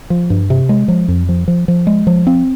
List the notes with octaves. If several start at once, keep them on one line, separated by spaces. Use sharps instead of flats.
F3
G2
C3
G#3
F3
F2
F3
F3
F3
G#3
F3
C4